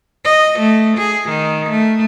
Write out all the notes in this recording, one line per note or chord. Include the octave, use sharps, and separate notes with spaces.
D#5
A3
G#4
D#3
A3